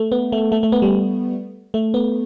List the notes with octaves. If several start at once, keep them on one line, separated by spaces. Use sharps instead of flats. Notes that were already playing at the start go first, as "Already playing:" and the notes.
Already playing: A3
B3
A3
A3
A3
B3
G3
A3
B3